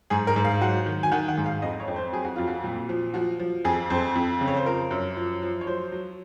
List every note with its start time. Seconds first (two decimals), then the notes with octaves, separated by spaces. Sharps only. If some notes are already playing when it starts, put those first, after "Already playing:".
0.10 G#2 G#4
0.27 A#4
0.36 G#2
0.44 F5
0.61 F#3 F#5
0.86 D#3
1.03 G#5
1.12 D#3 F#5
1.28 F#5
1.37 G#2
1.46 F5
1.62 F2 D#5
1.80 C#5
1.88 F2
1.96 C5
2.13 F#3 G#4
2.25 F#4
2.36 F2 F4
2.48 F#4
2.64 A#2
2.89 F3
3.14 F3 F#4
3.39 F3
3.65 F2 G#4
3.90 F2 C5
4.15 F2
4.41 C#3
4.48 C#5
4.57 C5
4.66 F3 A#4
4.91 F#2
5.17 F3
5.42 F3
5.61 C#5
5.67 F#3 C5
5.92 F#3